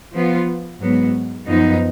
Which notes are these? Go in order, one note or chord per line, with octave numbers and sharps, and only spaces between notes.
F3 B3 F4
G#2 F#3 B3
F#2 F3 B3 D#4